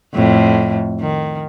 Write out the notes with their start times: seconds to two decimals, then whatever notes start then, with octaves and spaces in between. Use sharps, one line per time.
0.14 F2 A2
1.00 D#3